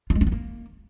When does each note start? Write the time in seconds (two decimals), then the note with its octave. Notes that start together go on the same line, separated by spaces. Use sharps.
0.10 F4
0.16 G#3
0.21 D4
0.27 B3
0.32 A#3